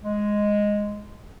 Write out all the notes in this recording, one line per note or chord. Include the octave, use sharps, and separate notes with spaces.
G#3